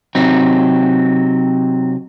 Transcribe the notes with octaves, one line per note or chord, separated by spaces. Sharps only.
C3 F#3 C4 D#4